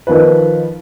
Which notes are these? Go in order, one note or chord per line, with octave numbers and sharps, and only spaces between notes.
D#3 F3 F4 B4